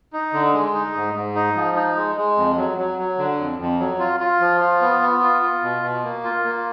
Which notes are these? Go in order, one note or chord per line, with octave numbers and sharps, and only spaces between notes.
D#4
D3
G#3
D#4
G#2
G#2
D#4
F3
D#4
G#3
G#3
F2
F#3
F#3
F#3
D3
F2
F2
F#3
F4
F4
F3
F4
B3
B3
F4
F4
B2
B2
A#3
F4
A#3